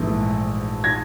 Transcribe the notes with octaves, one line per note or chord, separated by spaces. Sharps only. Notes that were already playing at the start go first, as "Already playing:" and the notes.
Already playing: A#1 G#2 E3 A3
G#6 A#6